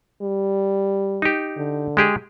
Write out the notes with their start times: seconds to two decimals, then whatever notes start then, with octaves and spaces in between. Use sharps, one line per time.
0.22 G3
1.22 D#4 G4
1.57 D3
1.97 G#3 G4 G#4